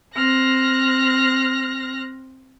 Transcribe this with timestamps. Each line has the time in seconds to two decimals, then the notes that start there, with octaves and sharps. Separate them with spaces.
0.14 C4 F6 F#6 A#6